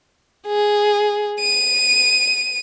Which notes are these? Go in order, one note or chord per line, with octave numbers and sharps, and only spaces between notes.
G#4
D#7